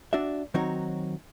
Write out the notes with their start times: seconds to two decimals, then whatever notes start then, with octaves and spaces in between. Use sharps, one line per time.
0.13 D4 F#4 D5 E5
0.54 D#3 F#3 C4 D#4 F#4 C#5